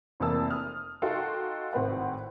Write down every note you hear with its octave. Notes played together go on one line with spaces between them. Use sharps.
F1 F2 E3 A#3 A5 E6
D#6 F6
D#4 F#4 A4 F5 G5 C6
G#1 A2 C4 B4 F#5